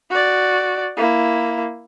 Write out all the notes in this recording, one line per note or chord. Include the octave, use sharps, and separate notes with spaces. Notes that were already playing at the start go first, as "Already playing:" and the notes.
F#4 D5
A#3 E4